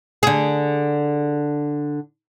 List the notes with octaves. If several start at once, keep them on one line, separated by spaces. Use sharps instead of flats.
D3 G#4